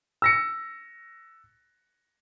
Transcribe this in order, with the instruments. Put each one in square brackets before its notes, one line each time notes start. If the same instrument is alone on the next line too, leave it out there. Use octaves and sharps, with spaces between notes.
[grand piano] E6 A#6 C#7